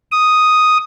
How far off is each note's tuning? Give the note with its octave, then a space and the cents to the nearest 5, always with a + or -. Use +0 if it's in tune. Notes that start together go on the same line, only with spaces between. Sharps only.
D#6 +0